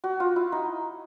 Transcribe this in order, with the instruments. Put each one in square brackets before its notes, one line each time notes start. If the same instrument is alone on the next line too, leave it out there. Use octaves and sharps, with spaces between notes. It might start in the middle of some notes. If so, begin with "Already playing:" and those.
[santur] F#4
F4
E4
D#4